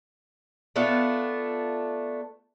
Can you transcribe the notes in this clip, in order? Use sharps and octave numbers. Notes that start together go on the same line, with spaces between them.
A3 B3 D4 F4